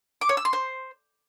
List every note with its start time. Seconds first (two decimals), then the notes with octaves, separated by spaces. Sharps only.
0.21 D6
0.29 C#5
0.37 E6
0.45 C6
0.53 C5